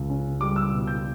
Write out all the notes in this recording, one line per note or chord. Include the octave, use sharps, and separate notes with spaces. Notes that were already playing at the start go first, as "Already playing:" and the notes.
Already playing: C#2
C#4
G3 D6
E6
B2
G6